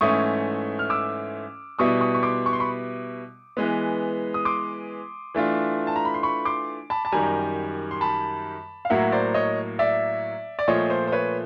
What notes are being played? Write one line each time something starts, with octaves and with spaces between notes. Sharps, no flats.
G#2 E3 A3 C#4 E4 C#6 D#6
F6
D6 E6
B2 G3 B3 E4 C#6 D#6
C#6 D#6
C#6
C6 D6
C#6
C6
B5 C#6
E3 G#3 B3
D#6
C6 D6
E3 A3 D4 F4
A5
A#5
B5
C6
B5 C#6
C6 D6
A5 B5
A5
F#2 D#3 G3 G#5 A#5
C6
A5 B5
F5
A2 F#3 A#3 E5 F#5
C5 D5
C#5 D#5
D5 E5
D5
A#2 F3 A3 C#5 D#5
C5
C5
B4 C#5